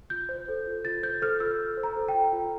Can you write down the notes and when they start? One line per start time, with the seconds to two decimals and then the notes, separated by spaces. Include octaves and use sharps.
0.10 F4 G6
0.29 C5
0.48 A4
0.67 F4
0.85 F4 A6
1.03 C5 G6
1.22 A4 F6
1.40 F4 E6
1.59 F4
1.77 C5
1.83 A#5
1.97 A4
2.08 G5
2.15 F4
2.33 F4